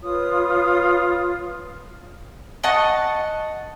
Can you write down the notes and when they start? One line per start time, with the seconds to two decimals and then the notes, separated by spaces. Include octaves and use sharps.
0.01 F4 B4 C#5 D#6
2.64 D#5 F#5 A5 C#6